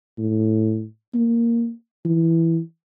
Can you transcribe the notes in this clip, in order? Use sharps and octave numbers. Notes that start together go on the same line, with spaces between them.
A2
A#3
E3